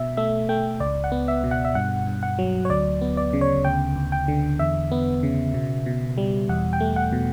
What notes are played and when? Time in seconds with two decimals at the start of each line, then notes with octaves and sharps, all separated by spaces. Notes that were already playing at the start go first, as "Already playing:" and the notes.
Already playing: B2 E5
0.17 A3 E5
0.49 A3 G5
0.80 C#2 D5
1.04 F#5
1.12 B3
1.28 E5
1.44 B2
1.51 F#5
1.65 E5
1.75 G2 F#5
2.07 G2
2.23 F#5
2.39 F#3
2.65 C#5
2.70 D2 D5
3.01 B3
3.17 D5
3.33 C#3
3.41 C#5
3.64 D2 G5
3.96 D2
4.12 G5
4.28 D3
4.59 E2 E5
4.92 B3
5.23 C#3
5.54 B2
5.86 B2
6.18 G3
6.49 E2 F#5
6.73 G5
6.80 A3
6.96 F#5
7.12 B2